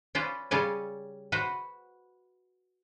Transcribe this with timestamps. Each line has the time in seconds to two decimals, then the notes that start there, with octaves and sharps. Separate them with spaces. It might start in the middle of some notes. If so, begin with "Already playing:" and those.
0.15 C#4 F4 B4 C5 D5
0.51 C#3 G3 C#4 F4 D5 G#5
1.32 F#4 B4 C5